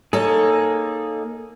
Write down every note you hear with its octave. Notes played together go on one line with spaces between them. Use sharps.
A#3 D#4 G#4 A4 C#5